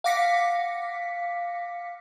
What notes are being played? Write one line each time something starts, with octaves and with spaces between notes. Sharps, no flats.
F5 F#5 D6 A#6 B6 C#7